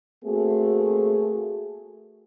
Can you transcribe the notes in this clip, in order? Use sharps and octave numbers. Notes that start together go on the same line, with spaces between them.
A3 A#3 C4 F#4 G#4